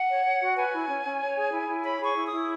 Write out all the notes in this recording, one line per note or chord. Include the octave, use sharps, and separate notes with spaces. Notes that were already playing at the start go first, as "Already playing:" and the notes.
Already playing: F#5
C#5
C#5
F#4
B4 G#5
E4
C#4
C#4
C#5
G#4
E4
E4
C#5 B5
G#4
C#6
E4
D#6
E4